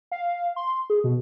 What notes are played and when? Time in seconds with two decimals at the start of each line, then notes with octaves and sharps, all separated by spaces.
0.12 F5
0.56 C6
0.90 G#4
1.04 B2